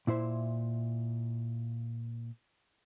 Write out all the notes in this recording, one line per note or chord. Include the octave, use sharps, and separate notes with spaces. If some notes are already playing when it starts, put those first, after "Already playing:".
A#2 E4 C5 E5